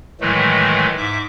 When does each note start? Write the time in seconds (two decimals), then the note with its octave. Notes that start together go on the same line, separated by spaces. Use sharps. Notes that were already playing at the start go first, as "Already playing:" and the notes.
0.21 A2 D#3 E3 F#3 G#3 A3
0.97 G#2 E5 D6